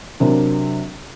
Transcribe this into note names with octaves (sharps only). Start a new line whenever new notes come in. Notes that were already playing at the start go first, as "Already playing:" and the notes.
C3 F#3 C4 D4 A#4